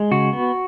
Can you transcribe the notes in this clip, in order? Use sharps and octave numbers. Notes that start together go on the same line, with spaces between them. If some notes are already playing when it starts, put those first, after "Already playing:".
Already playing: G#3
C#3 F#4
B3